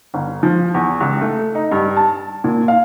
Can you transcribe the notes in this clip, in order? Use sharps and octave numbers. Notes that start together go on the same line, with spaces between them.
G1
F3
E2
C#2
A3
D#4
G2
A5
A#2
F5